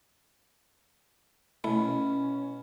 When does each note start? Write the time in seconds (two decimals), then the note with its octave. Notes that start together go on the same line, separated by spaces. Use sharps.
1.64 B2 A3 C#4 E4 B5